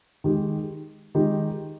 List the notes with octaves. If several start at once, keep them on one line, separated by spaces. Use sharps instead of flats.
D#3 G#3 D#4 G4
D#3 G#3 D#4 G4